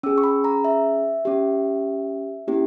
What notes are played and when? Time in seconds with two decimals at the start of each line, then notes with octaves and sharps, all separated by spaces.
0.03 C#4 G#4 E6
0.18 C#6
0.24 B5
0.44 A#5
0.64 E5
1.25 C#4 G4
2.48 A#3 C#4 E4 G4